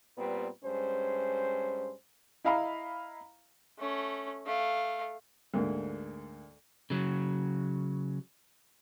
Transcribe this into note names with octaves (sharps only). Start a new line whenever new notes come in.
A#2 G3 B3 C4 B4
G2 G#3 C#4 C5
E4 D#5 F5 A#5 B5
A3 C#4
A3 F5
D2 G#2 A#3
C#3 F#3